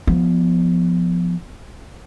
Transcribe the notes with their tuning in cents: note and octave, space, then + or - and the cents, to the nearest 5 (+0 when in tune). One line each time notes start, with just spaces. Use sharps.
F3 +0 B3 +0